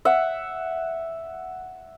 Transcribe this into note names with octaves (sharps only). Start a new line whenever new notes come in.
E5 F#5